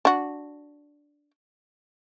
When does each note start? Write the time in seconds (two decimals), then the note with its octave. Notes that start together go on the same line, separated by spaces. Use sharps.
0.05 D4 F#4